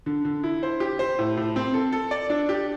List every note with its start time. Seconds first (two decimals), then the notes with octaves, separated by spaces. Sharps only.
0.06 D3
0.25 D3
0.43 E4
0.63 C5
0.80 G4
0.99 C5
1.19 A2
1.37 A2
1.56 C4
1.74 A4
1.92 A4
2.11 D5
2.30 D4
2.49 G4